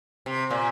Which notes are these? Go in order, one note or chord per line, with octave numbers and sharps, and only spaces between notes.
C3
A#2